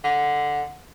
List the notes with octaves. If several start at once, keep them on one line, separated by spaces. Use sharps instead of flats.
D3